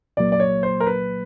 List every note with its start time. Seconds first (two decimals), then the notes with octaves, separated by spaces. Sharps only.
0.17 C2 A#2 F#3 A#3 D5
0.32 D5
0.40 C#5
0.63 C5
0.80 A#4
0.87 B4